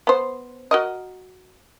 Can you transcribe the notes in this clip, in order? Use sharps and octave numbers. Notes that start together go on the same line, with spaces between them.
B3 C5
F#4 A#4 D#5